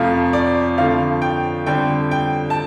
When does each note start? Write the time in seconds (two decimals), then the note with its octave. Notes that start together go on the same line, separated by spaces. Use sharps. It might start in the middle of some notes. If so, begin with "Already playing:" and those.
Already playing: F2 C3 F3 A3 F5
0.33 D5
0.78 F2 D3 F3 A3 F5
1.22 G5
1.66 F2 D3 G3 G5
2.11 G5
2.50 A5